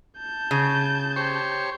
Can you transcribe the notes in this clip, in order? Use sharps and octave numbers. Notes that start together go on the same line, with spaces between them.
A5 G6
C#3
G4 C5 C#5